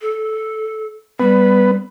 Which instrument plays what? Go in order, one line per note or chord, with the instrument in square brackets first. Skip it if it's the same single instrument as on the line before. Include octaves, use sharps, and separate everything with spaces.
[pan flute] A4
[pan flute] G3 [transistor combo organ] B3 B4